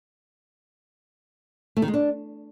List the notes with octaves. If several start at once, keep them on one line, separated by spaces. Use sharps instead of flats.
A3
D#3
G#3
D4